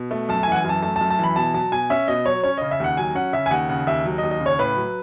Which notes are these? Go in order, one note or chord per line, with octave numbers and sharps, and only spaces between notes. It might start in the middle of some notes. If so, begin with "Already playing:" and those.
Already playing: B2
A3
F#2 A5
G#5
E3 F#5
G#5
F#2 A5
A3 A5
F#2 A5
A5
E3 B5
B2 A5
F#3 A5
B2 G#5
C#4 E5
B2 D#5
F#3 C#5
C#4 C#5
C#3 D#5
E5
D#2 F#5
F#3 G#5
C#4 F#5
C#3 E5
G#5
D#2 F#5
C#3 F#5
D#2 E5
F#3
D#5
D#2
D#5
C#3
C#5
A2 B4
F#3